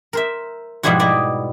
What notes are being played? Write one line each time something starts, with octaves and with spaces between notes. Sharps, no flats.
A#4 C5 E5
G#2 B2 F3 G3 E4 F#4
E4 D5 D#5